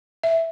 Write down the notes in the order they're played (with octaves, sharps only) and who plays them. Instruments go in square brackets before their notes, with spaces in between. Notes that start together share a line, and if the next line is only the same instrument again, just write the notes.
[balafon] E5